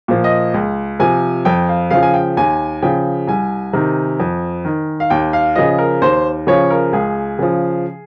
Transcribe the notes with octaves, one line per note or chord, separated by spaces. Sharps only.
A#2 F3
D#5
C#2
C3 F3 G#5
F2 G5
F5
C#3 F3 F5
G#5
G5
D#2 G#5
C#3 F3 G5
C2 G#5
C3 D#3
F2
D#3
F5
D#2 G5
F5
C#3 F3 D#5
A#4
D#2 C5
C#3 F3 C#5
A#4
C#2 G#4
C#3 F3